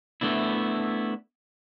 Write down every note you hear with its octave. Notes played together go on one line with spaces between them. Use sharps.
A3 B3 D4 E4